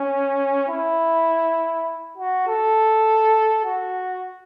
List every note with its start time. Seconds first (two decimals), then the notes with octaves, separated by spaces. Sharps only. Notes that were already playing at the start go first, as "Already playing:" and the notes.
Already playing: C#4
0.69 E4
2.17 F#4
2.47 A4
3.65 F#4